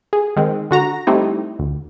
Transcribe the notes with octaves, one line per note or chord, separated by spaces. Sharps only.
G#4
D#3 G#3 C4
D3 F#4 A#5
G3 A3 C4 D#4 E4
D2